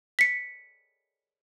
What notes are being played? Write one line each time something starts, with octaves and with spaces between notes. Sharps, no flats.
B6 C#7